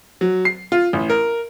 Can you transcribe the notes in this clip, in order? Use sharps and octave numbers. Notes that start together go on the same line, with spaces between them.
F#3
C7
F4
A1
A#4